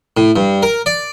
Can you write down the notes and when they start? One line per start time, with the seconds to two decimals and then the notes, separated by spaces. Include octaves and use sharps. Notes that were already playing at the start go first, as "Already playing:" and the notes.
0.17 A2
0.36 G2
0.63 A#4
0.86 D5